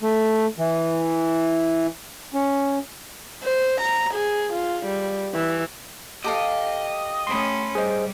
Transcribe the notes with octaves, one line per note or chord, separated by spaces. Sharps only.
A3
E3
C#4
C5
A#5
G#4
F4
G3
E3
G4 A4 D#5 F5
A3 C#4 B5 C6
G3 G#4 C5 D#5